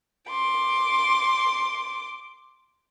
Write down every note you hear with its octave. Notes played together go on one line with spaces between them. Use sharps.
C6 D6